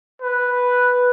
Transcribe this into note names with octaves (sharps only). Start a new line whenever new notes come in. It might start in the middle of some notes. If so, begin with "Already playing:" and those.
B4